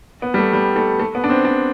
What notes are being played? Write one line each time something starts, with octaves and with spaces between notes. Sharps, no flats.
B3
G3
A3
G3
A3
A3
B3
D4
C4
D4